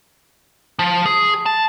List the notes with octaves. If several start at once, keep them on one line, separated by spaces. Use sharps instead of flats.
F3
G#4
A5